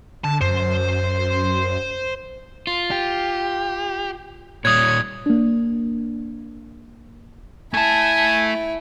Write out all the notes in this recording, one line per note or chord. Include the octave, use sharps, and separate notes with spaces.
D3 A5
F#2 C5
F4
G4
A#2 G3 C#5 D#6 F#6 G#6
A#3 D4
A3 E4 G#5 A5